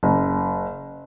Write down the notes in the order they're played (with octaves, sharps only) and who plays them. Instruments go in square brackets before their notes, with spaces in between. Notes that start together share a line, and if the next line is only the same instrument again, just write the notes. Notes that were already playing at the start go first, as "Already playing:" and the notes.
[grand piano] F#1